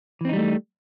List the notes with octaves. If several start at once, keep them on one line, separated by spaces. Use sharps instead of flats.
E3 G3 A3 C4 D#4